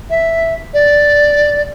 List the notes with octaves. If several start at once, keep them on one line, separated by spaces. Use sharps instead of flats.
E5
D5